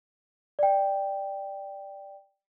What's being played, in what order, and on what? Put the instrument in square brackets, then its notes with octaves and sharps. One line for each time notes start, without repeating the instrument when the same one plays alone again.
[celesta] D5 G5